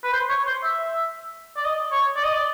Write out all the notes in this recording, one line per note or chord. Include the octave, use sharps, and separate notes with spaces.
B4
C5
C#5
C5
E5
D5
D#5
C#5
D5
D#5
D5